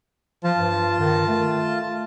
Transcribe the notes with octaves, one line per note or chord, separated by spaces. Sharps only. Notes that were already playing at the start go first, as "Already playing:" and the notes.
F3 F4 A5
G2
D#3
A3